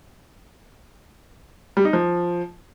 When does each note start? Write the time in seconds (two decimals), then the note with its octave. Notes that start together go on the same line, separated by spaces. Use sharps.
1.77 G3
1.85 D#4
1.93 F3